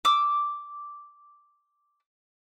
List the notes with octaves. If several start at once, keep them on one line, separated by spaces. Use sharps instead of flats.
D6 E6